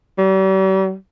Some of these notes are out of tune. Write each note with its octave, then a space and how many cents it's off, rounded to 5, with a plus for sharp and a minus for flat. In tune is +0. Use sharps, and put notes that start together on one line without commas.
G3 -40